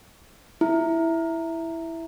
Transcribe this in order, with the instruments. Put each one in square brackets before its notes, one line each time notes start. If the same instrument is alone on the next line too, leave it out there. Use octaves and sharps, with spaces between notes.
[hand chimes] E4